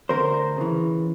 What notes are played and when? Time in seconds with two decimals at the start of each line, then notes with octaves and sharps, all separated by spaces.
0.09 D2 A#4 C5
0.57 C#3 E3